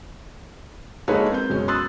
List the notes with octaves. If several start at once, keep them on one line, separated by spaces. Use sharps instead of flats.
G#3 A#3 D#4 A4 B4 C#5
C4 G6
F#2 B2 G#3 C#4
C6 D#6 E6 F#6 A6